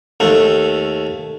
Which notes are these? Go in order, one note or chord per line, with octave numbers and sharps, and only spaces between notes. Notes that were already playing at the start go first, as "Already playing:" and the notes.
D#2 A3